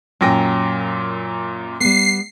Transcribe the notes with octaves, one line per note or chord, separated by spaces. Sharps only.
F#2 A#2 F#3 G5 G#5 A#6
G3 B3 C7